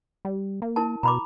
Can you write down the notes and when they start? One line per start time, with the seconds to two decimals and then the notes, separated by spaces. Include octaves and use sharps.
0.25 G3
0.62 A#3
0.76 E4 A#4 A5
1.03 B2 A#5 B5 D6